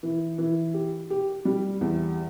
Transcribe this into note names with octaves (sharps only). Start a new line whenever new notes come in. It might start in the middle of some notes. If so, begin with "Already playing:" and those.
E3
E3
G4
G4
G3
E2